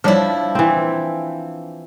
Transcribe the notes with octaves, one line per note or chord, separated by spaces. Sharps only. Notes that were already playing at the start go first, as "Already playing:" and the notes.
F3 G3 D4 E4 C#5 D5
E3 C4